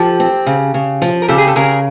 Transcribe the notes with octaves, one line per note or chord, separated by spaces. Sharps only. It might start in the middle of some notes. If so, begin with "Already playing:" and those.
Already playing: F3 G4 A4
C4
C#3
C#3
F3
A#4
C#3 G4 A4
G#4
A4
C#3 G#4 A#4